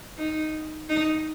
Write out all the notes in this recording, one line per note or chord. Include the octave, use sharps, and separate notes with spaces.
D#4
D#4